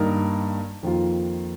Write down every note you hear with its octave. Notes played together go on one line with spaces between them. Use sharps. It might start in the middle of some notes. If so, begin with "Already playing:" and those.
Already playing: G2 D#3 A#3 D#4 A#4
F2 D#3 A#3 F4